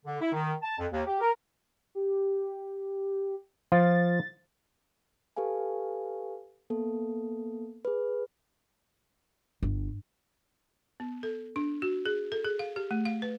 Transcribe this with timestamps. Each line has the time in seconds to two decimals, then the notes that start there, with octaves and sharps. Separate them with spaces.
0.06 D3
0.21 E4
0.33 D#3
0.63 A5
0.79 F2
0.92 D#2
1.07 G4
1.21 A#4
1.95 G4
3.72 F3 F4 A6
5.36 G4 A4 B4 F5 G#5
6.70 A#3 B3 A4
7.85 G#4 B4
9.63 G1
11.00 B3
11.23 A4
11.56 D4
11.82 F#4
12.06 G#4
12.32 A4
12.44 G#4
12.59 F5
12.76 G4
12.91 A3
13.05 F5
13.22 B4